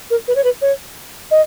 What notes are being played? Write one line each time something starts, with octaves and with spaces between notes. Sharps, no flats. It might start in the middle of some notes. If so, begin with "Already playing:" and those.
A#4
B4
C#5
B4
C#5
D#5